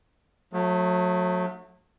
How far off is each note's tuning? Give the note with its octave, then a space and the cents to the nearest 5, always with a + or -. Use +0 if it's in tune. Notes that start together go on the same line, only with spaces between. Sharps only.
F#3 -35 A3 +0